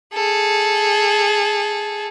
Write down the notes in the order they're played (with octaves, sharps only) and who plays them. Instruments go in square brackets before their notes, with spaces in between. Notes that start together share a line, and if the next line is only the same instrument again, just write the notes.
[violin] G#4 A4